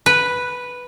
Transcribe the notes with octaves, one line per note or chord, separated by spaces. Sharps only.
B4